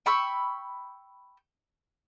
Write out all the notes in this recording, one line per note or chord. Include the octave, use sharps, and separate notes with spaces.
G5 B5 C#6 E6